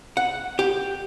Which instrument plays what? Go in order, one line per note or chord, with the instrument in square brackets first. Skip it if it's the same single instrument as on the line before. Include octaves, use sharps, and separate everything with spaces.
[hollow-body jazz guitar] F#5
G4